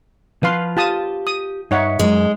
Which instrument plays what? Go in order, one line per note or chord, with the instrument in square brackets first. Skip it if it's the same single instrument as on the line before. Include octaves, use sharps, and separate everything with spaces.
[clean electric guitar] F3 F4 [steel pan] B4 F5 C6
[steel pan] F4 A5 D#6 [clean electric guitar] G4
[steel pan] D#6
[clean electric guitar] G2 E5 [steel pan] D#4 C#5 F#5
[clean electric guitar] F#2 [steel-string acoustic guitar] G#3